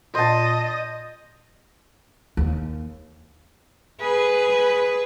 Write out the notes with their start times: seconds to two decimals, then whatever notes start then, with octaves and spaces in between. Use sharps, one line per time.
0.15 A#2 C5 D#5 A5
2.37 D#2
4.00 G#4 B4